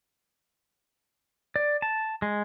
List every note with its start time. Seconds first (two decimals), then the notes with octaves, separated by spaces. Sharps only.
1.56 D5
1.82 A5
2.22 G#3